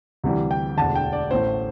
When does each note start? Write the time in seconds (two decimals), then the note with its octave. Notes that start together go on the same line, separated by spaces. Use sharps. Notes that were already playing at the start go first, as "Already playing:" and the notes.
0.24 D2 C3 E3 G3
0.51 G5
0.77 E1 D2 D3 A5
0.95 G5
1.13 D5
1.31 A1 A2 A3 C5